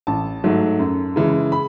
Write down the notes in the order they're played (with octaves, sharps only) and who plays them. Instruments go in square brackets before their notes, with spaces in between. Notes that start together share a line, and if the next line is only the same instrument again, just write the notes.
[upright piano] A1 A5
G#2 F#3 A3
F#2
C#3 E3 G#3
B5